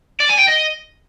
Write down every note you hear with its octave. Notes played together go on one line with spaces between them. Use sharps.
D5
G#5
G5
D#5